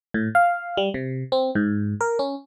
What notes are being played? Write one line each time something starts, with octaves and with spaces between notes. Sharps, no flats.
A2
F5
G3
C3
C4
G#2
A#4
C#4